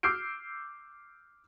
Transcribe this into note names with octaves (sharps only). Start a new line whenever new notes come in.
D6 E6 F6 G6 C7 D7